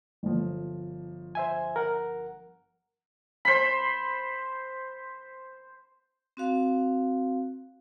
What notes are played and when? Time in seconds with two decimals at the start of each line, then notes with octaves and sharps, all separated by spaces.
0.23 G1 F3
1.35 C5 E5 G#5
1.76 A#4 F#5
3.45 C5 B5
6.37 C4 F#4 F5